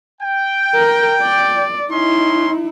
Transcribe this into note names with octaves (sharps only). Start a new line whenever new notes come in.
G5
A#4
D5
C#4 D#4 E4 D#5 C6